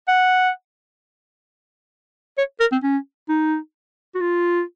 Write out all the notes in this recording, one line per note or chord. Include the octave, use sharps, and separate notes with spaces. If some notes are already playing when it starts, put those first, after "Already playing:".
F#5
C#5
A#4
C4
C#4
D#4
F#4
F4